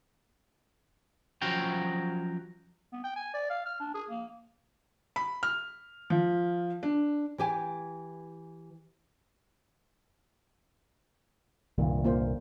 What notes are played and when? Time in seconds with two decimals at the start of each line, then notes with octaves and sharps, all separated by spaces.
1.42 F3 F#3 C#4 F#4 F5 G5
2.93 B3
3.04 G5
3.16 G#5
3.34 D5
3.50 F5
3.66 F6
3.80 D4
3.94 G#4
4.10 A#3
5.16 B5
5.43 F6
6.10 F3
6.83 D4
7.38 E3 G4 G#5
11.78 C2 G2 A#2 D#3
12.04 A#3 F4 C5